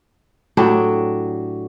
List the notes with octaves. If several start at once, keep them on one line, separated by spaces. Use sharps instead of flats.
A2 F#3 D4 G4